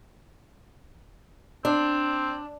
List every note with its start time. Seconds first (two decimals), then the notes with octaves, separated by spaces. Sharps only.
1.65 C4 D4